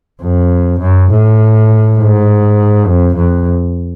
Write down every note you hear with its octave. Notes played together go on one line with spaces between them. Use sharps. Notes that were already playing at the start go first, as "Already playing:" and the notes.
F2
F#2
A2
G#2
F2
F2